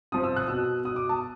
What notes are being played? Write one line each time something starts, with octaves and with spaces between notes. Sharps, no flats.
C3 F3 D#6
E6
F#6
B2 E6
B2 D#6
D6
A5